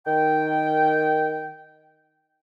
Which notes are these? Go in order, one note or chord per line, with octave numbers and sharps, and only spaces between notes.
D#3 G5